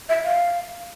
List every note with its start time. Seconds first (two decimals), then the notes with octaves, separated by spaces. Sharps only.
0.09 E5
0.24 F5